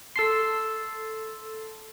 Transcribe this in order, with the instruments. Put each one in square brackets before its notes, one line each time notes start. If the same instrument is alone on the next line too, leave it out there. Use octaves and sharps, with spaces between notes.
[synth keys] A4 A5 C6 [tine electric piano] E6 C7